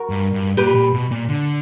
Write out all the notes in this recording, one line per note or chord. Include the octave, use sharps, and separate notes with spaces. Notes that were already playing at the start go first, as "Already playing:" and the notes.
Already playing: F#4 A#4
G2
G2
A#2 G4 B4
A#2
B2
A#2
D3